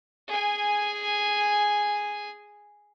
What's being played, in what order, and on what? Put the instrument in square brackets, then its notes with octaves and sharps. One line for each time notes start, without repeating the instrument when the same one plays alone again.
[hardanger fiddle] G#4 G#5